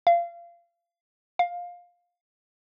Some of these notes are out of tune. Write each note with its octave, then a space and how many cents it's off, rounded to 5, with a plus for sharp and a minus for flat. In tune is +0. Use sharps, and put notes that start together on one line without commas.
F5 -25
F5 +15